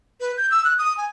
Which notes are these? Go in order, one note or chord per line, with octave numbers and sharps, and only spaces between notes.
B4
G6
E6
F#6
D#6
G#5